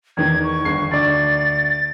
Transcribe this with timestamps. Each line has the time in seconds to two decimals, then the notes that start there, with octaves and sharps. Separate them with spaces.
0.17 E2 D#3 G#6
0.44 C#6
0.65 G1 C7
0.91 D2 D5 A6